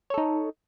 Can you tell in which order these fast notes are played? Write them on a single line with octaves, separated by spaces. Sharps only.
C#5 A4 D#4